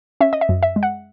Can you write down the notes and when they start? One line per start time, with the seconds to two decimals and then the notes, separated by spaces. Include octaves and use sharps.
0.21 C#4 E5
0.33 D#5
0.41 E5
0.49 F#2
0.63 E5
0.76 G#3
0.83 F#5